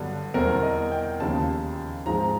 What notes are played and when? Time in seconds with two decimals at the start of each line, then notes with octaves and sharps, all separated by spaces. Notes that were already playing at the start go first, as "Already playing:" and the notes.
Already playing: G2 D3 F#3 B3
0.34 E2 B2 G3 C4 A#4
0.63 D#5
0.91 G5
1.20 D#2 C#3 F3 A5
2.06 G#2 F3 G#3 C4 A#5